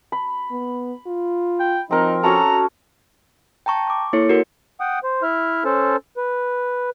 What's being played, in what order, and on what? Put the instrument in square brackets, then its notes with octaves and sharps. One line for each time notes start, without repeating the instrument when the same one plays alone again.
[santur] B5
[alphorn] B3
F4
[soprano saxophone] G5
[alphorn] F3 [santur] C4 A#4 [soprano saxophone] D#4
[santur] C#4 F#4 A4 [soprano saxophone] A#5
[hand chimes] G5 A5 A#5 C#6
C#6 D6
A#3 E4 A4 C#5 C#7
F#4 A#4 C#7
[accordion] F#5 G5 D#6
C5
E4 E5 F6
C#4 A4 C5 A5
B4